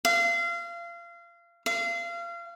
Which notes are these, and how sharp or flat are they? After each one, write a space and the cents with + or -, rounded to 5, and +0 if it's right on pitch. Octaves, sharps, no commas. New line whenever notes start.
F5 -30
F5 -30